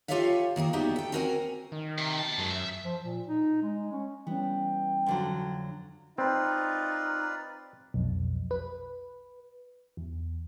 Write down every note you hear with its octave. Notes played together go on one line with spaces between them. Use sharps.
F4 G4 A4 C#5 E5 F5
D#3 A#3 G#4 A#4
G2 B3 D#4 F#4 G4 E5
A4 G5
C4 C#4 F#4 A#4 E5 G#5
D#3
C3
B2 A5
F#2 F#3 G#3
E5
F3
A#2
D#4
G#3
C#4
E3 G3 B3 C#4 G5
F2 D3 F#3
C4 D#4 F4 B4 D5
B1 F2
B4
E2